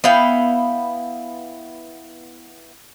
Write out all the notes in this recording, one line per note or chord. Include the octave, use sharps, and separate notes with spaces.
B3 E4 F5 G5